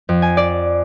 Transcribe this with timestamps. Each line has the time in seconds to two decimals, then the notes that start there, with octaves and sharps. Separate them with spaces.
0.09 F2
0.22 G#5
0.37 D5